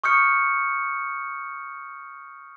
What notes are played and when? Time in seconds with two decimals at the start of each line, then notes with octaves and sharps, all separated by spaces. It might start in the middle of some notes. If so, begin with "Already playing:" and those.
0.04 C#6 D#6 F6 G6 C#7